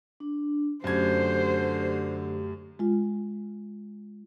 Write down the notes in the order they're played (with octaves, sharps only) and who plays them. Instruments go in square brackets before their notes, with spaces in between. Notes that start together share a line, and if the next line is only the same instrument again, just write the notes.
[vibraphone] D4
[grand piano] F#2 G#6 [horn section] D3 [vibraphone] A3 G4 [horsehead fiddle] C5
[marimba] G#3 F4